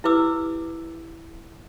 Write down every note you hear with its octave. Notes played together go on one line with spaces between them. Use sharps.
E4 G4 B4 D6 E6